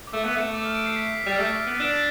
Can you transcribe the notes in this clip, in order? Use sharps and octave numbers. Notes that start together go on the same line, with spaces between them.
D6
A3 E6
B3
A3
D6
F6
D7
C7
B6
C7
B6
G3 A6
F6
A3 E6
F6
B3
D4 E6